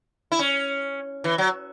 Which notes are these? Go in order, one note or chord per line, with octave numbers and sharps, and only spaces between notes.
E4
C#4
E3
F#3